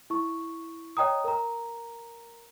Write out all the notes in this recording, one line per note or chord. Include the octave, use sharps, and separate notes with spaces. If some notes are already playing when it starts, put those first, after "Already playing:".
E4 C#6
C#5 D#5 G5 A#5 D#6
A#4 A#5